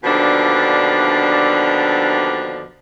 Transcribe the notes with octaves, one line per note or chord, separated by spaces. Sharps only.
D#2 B2 D3 F3 D4